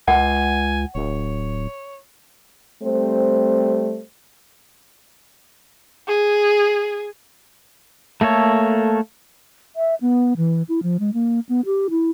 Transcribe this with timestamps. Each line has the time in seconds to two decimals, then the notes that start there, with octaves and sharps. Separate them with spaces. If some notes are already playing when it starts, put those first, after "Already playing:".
0.08 C#2 F#5 G#5
0.95 D1 C#5
2.83 G3 A3 C4 C5
6.07 G#4
8.21 A3 A#3 A4 C#5
9.76 E5
10.01 B3
10.37 E3
10.69 E4
10.83 F3
11.00 G#3
11.14 A#3
11.49 B3
11.66 G4
11.90 E4